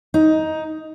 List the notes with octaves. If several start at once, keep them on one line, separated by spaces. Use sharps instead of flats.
D#4